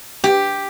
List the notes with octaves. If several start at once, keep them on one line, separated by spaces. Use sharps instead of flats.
G4